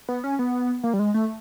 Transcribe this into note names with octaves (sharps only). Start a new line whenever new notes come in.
B3
C#4
B3
A#3
G3
G#3
A3